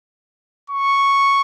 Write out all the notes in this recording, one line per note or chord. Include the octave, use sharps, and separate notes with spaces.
C#6